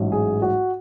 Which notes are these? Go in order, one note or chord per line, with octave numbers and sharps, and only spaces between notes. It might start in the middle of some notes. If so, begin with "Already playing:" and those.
Already playing: A1 G#2 F#3
G#4
F#4